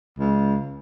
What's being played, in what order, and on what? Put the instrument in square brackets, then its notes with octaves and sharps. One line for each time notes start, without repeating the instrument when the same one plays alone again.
[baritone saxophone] C#2